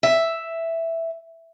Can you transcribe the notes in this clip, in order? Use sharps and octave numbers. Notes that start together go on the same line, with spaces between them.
E5